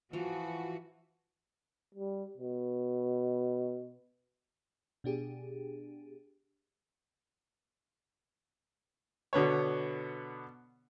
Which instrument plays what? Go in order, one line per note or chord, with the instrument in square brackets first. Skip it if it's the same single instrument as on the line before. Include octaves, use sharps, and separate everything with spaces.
[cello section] E3 F#4 [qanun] F3
[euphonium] G3
B2
[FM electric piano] B2 D4 G4 G#4
[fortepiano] B2 D3 B3 C#5